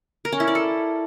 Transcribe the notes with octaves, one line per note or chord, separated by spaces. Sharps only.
A#4
C#4
E4
D5
A4